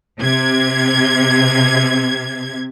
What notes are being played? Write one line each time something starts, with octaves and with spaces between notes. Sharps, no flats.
C3 G#6